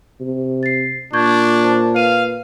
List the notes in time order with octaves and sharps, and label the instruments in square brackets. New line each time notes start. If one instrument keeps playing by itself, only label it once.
[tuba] C3
[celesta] A6 C7
[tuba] A#2 [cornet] D4 [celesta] C#6 G6 G#6
[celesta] C5 A5
[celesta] B4 D#7 [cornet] F5